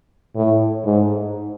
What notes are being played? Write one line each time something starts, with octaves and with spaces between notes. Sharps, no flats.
A2
G#2